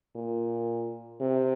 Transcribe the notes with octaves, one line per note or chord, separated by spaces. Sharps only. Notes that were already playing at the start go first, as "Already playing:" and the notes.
A#2
C3